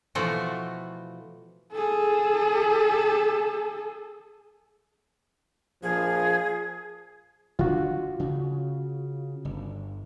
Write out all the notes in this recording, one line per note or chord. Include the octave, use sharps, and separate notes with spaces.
B2 E3 F3 A3 F#4
G#4 A4
A#1 F3 G#4
D3 D4 F4 F#4
C#3
G1